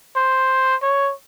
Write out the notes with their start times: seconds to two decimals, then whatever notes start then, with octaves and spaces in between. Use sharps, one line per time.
0.16 C5
0.82 C#5